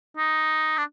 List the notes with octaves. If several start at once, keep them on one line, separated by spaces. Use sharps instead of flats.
D#4
D4